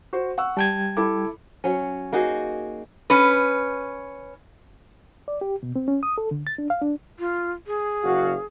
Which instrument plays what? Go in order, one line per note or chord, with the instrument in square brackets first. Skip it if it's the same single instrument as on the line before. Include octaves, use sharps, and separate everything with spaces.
[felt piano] F#4 C5
F#5 C#6 E6
[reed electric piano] G3 G5 G#6 [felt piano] A5
[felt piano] E4 A4 D6
[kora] F#3 C#4
A#3 D#4 F#4 G#4
[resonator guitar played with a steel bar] C#4 B4
[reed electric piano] D5
G4
B2
C4
C#4
D#6
A4
D3
A6
D4
F5
D4
[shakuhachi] F4
G#4
[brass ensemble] F#1 F#4 F5